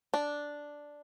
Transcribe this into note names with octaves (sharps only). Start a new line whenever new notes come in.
D4